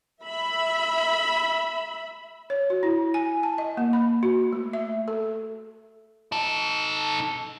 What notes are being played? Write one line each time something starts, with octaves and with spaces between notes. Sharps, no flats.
E5 B5
C#5
F#4
E4
G#5
A5
D#5
A#3
B5
F#4
A3
E5
A4
D#4 A4